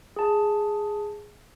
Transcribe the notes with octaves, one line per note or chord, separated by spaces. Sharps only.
G#4 A5